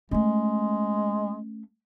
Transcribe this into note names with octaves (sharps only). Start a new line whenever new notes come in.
G#3 A3 C#4